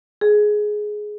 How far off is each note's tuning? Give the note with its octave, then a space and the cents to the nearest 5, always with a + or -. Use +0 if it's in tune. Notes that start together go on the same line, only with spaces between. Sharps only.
G#4 +15